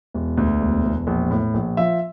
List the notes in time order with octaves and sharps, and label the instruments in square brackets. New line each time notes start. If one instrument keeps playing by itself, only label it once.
[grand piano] E1
D2
E1
E1
A#1
A2
A#1
F3 E5